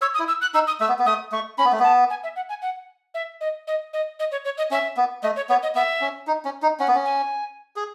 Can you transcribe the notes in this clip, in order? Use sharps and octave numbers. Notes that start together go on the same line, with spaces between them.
C#5 E6
D#6
E4
E6
F#6
D#4 E6
D#6
A3 E6
B3
B3
A3 D#6
A3 C#6
C#4 B5
B3
A3
B3 A5
G#5
E5
F#5
G#5
F#5
E5
D#5
D#5
D#5
D#5
C#5
C#5
D#5
C#4 E5
B3
A3 D#5
C#5
B3 C#5
D#5
B3 E5
C#4
D#4
C#4
D#4
C#4 F#5
B3
C#4
G#5
G#4